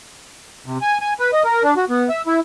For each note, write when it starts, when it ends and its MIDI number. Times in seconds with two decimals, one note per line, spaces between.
0.66 0.78 48
0.81 0.98 80
1.01 1.13 80
1.20 1.31 71
1.33 1.43 75
1.44 1.63 70
1.64 1.74 62
1.77 1.85 66
1.90 2.09 59
2.09 2.22 76
2.27 2.40 64